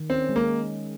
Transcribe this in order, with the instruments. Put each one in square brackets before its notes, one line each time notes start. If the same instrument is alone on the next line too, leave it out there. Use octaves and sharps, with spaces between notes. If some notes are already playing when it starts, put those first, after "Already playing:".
Already playing: [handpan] D#3
[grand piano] C4 [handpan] C#4
[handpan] G#3
[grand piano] A#3